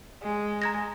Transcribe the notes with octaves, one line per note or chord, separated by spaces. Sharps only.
G#3
A#5 G#6 A#6